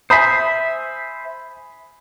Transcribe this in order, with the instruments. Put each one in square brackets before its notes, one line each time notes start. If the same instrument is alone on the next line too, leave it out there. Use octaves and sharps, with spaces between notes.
[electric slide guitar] C5 E5 [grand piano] G#5 B5 D#6